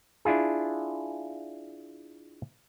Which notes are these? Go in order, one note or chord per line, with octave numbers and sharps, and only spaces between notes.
D4 E4 F4 G#4